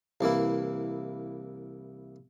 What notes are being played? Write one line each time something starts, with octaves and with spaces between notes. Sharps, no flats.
C2 E3 A#3 E4